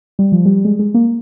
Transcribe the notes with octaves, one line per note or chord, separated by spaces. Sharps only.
G3
F3
G3
G#3
G#3
A#3